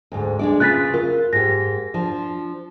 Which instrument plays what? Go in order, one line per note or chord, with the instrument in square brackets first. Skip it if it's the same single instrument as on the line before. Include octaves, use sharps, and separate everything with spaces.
[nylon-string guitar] D2 G#2
G#3 D4 D5
[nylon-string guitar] C#3 F4 B4 [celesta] F#6 A6 B6
[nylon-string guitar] F4 [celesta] A#4
[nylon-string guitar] G#2 G4 [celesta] A#6
[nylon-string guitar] F3 D4